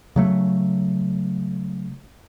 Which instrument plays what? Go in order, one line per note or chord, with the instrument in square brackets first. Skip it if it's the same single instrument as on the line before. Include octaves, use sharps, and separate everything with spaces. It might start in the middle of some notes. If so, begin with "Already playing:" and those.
[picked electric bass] C#3 F#3 A3